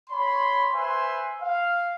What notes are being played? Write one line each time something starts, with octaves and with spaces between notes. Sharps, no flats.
C#5 B5 C6
B4 C5 E5 G#5 B5 C6
F5